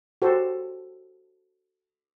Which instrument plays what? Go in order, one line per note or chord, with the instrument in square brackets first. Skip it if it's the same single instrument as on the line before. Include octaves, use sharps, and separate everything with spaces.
[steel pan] F#4 G4 A4 C5